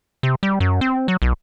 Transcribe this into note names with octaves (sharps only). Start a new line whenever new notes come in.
C3
G3
F#2
C4
F#3
B1